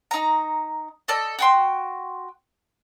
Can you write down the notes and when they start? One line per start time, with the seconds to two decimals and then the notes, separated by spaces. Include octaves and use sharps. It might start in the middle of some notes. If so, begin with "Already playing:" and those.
0.11 D#4 A#5
1.08 A4 D5 D#5
1.39 F#4 G5 C6